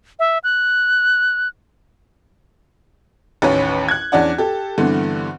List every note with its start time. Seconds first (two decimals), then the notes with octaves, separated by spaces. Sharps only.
0.19 E5
0.44 F#6
3.42 A1 D#2 C#4 B4 C#5
3.89 F#6 G#6
4.12 E2 C#4 D4 D5 F#5
4.38 G4 A4
4.78 G2 D3 E3 B3 C4